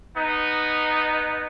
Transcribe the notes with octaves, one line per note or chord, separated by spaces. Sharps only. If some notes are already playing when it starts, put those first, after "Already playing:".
B3 D#4